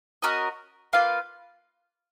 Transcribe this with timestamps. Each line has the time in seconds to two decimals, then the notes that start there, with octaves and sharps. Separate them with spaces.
0.22 C#4 F#4 A#4 D#5
0.93 A#3 F4 B4 F5